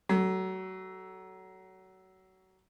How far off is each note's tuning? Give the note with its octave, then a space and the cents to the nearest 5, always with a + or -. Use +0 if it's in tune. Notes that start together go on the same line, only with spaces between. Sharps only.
F#3 +25 A3 +0